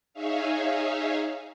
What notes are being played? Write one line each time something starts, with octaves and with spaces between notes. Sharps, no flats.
D#4 G#4 C#5 E5 F5